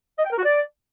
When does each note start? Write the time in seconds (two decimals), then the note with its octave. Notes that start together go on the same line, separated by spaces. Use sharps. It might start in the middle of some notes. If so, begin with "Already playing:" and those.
0.19 D#5
0.25 G5
0.32 A#4
0.39 F#4
0.46 D5